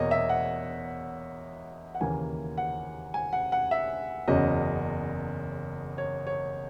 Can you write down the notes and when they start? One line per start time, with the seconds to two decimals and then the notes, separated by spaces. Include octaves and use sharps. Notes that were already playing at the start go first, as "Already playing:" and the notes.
Already playing: E2 B2 A#3 C#5 D#5
0.11 E5
0.29 F#5
1.95 F#5
2.01 D#2 C#3 E3 A#3 G#5
2.58 F#5
3.14 G#5
3.33 F#5
3.52 F#5
3.71 E5
4.28 F#1 E2 C#3 F#3 D#5
5.98 C#5
6.27 C#5